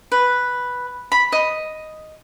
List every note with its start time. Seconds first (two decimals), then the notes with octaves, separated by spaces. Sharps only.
0.12 B4
1.12 B5
1.32 D#5